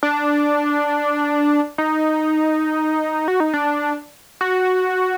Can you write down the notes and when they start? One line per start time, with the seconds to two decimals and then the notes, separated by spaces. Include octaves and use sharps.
0.03 D4
1.78 D#4
3.28 F#4
3.40 D#4
3.54 D4
4.41 F#4